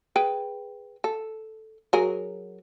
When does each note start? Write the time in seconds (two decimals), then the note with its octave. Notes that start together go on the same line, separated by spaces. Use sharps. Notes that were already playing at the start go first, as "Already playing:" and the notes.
0.16 G#4 B4 G5
1.04 A4
1.93 F#3 G#4 A#4